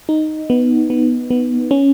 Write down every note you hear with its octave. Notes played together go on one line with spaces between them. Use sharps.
D#4
B3
B3
B3
C#4